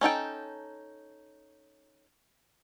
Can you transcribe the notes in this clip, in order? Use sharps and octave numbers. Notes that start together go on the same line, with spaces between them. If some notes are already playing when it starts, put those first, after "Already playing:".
C#4 D#4 A4 G5